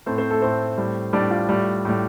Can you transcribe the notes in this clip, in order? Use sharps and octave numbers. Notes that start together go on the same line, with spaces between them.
A2 A3 C4 C5
C4 C5
A3 A4
A2 A3 C4 C5
A2 G3
A2 G3 D4 D5
F4 F5
A2 G3
A2 G3